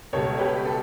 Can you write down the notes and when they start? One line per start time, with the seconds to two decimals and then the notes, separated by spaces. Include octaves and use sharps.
0.13 C#2 B2 G3 A4 C#5
0.39 G4 B4
0.65 A4